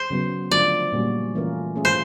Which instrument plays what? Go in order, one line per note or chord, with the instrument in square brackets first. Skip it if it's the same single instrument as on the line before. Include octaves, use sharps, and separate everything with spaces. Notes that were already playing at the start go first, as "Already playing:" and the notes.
Already playing: [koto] C5
[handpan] C#3 F#3 B3
[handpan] D3 F3 A3 D4 F4 [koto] D5
[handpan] A#2 G3 A#3 C#4 F#4
E3 A3 C#4 F4 A#4
A3 C#4 F4 G#4
[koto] C5